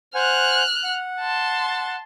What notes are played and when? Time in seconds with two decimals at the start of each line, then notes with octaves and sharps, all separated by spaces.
0.15 C5 F#5 G#5 F6 F#6
0.84 F#5
1.20 A5 C6